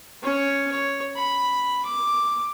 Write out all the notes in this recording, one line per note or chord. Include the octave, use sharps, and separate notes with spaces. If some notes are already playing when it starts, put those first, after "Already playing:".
C#4 C#5
C#5
B5
D6